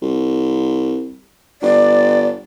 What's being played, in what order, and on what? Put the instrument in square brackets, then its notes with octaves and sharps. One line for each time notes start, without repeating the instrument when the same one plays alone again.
[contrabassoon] C2
[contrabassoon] G1 [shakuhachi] D5